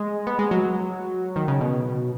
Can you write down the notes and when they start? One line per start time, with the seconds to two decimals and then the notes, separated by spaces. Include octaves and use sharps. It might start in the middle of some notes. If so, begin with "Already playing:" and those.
Already playing: G#3
0.27 B3
0.39 G#3
0.51 F#3
1.36 D#3
1.48 C#3
1.60 B2